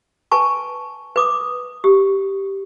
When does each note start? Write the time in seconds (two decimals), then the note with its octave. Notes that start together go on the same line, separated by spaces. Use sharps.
0.32 B4 G#5 A5 C#6
1.16 B4 D6 D#6
1.84 G4